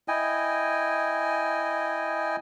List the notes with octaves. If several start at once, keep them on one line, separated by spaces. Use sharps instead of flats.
E4 D#5 G5 G#5